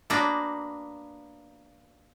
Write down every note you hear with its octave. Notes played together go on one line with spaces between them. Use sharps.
A#3 B3 D4 F#4